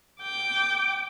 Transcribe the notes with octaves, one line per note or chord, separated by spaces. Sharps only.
G5 D6